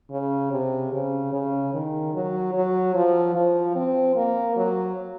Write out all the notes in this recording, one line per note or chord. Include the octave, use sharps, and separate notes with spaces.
C#3
C3
C#3
C#3
D#3
F#3
F#3
F3
F3
C4
A#3
F#3